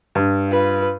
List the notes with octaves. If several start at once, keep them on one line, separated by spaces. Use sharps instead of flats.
G2
F4 B4